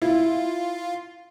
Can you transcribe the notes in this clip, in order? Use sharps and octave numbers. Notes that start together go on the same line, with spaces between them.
E4 F4